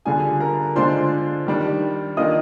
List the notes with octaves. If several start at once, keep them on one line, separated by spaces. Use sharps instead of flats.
D3 G3 D4 F4 G#4 G#5
A#4 A#5
D3 G#3 D4 F4 C5 C6
D#3 G3 D4
D#3 A#3 D4 F4 D#5 D#6